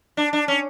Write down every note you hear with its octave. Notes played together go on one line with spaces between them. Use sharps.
D4
D4
C#4